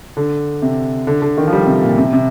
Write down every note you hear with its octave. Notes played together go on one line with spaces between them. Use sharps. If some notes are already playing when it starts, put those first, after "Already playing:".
D3
C3
D3
D3
D#3
F3
G3
C3
A#2
C3
C3